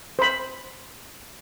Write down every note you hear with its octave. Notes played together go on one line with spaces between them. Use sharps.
C5 B5